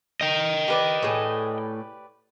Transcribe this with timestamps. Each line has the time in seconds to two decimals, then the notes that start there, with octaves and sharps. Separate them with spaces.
0.21 D#5 G5
0.68 G4 B4 D5
1.02 A2 G#4